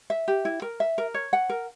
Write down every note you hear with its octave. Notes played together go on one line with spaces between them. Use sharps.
E5
G4
E4
A#4
E5
A#4
C#5
F#5
A#4